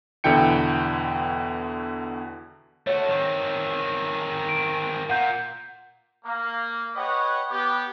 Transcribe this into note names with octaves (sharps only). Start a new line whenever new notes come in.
E2 B2 D3 E4 G5 C#7
A3 F#4 C#5
D#3 C4
D7
A#2 F#5 G6
A#3
G4 B4 C#5 D#5 F#5 B5
B3 G4